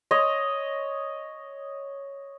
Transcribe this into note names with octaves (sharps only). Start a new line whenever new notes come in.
C#5 D#5